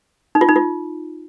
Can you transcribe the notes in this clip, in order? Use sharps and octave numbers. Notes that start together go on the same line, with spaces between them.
D#4
F4
D#4
F4